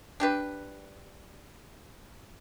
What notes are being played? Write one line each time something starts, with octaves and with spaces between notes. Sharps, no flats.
D4 G4 B4